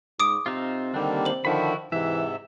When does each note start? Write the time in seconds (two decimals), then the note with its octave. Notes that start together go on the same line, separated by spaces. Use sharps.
0.20 G#2 D6 D#6 D7
0.46 C3 C4 D#4 F4
0.94 D3 D#3 G3 A#3 C4 D4
1.25 C5 F#7
1.45 D3 D#3 F3 E4 F#4 B5
1.92 G#2 C3 E3 E5